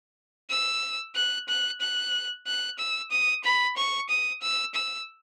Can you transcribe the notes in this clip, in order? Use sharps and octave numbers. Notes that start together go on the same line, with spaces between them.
E6
F#6
F#6
F#6
F#6
E6
D#6
B5
C#6
D#6
E6
E6